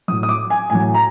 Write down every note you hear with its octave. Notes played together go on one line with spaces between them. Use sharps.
A2 F#3 D#6
D#6
D6
G#5
A2 F#3 G#5
A#5